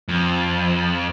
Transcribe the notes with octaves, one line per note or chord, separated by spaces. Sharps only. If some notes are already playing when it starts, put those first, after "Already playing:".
F2